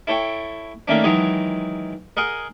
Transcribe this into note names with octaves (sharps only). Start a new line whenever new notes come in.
E4 A4 C#5 G5 C#6
D#3 A3 A#3 C#4 D4
D#3 E3 F#3 G#3 D#4
G#4 A#4 D#5 F#5